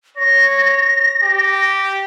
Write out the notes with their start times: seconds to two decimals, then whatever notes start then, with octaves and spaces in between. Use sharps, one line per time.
0.17 C#5 A#6
1.24 G4